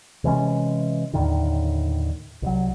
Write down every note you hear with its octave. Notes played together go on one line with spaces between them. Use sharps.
C3 E3 G#3 C#4
D#2 A2 D3 D#3
C2 F#3